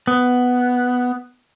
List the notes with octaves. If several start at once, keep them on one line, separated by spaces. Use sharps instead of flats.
B3